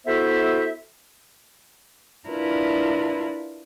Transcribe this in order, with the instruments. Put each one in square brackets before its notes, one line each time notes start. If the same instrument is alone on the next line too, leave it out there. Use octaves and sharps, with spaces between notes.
[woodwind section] B3 E4 F#4 A4 C5 E5
[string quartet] D4 E4 F4 A#4 B4